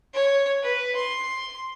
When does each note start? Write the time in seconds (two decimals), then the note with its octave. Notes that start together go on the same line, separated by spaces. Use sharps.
0.13 C#5
0.63 B4
0.95 C6